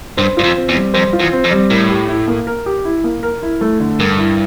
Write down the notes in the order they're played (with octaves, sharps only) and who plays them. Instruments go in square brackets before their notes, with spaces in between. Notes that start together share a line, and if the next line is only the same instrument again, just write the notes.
[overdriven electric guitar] G2 [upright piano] C5
[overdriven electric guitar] G2 [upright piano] F4
[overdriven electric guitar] F2
[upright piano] C4
[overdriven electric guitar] E2
[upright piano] G3
[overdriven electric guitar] F2 [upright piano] C5
[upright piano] F4
[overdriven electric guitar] E2
[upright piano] C4
[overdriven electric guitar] F2
[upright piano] G3
[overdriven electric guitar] A2 [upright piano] A#4
[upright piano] G4
E4
A#3
A#4
G4
E4
A#3
A#4
E4
A3
D3
[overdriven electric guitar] G2 [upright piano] A#4
[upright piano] E4